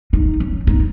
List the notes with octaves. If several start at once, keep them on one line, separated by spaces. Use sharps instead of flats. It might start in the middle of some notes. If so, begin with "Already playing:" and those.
D#4
C#4
D#4